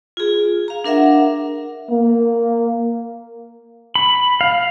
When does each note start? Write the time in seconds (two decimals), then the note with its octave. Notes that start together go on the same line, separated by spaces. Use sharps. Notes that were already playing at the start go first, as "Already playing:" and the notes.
0.17 F4 G#4
0.68 F5 A#5
0.84 D4 A#4 E5 F#5
1.90 A#3
3.95 B5
4.41 F5